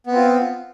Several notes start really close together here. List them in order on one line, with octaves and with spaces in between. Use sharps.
B3 C4 F4